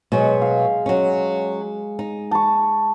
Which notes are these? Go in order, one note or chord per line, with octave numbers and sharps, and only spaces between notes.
B2 F#3 G#3
F5
F#3 C#4
D#4
A5 C#6